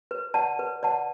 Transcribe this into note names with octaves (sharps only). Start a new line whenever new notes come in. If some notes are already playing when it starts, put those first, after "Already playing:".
B4
D5 F#5 A5
B4
D5 F#5 A5